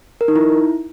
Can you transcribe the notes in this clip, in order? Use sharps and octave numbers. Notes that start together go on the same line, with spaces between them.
A#4
D#4
E4